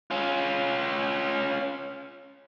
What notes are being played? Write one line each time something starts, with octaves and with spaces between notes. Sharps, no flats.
C#4 F4